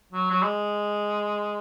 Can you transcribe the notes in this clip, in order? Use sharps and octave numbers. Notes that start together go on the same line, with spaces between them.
F#3
F#3
G#3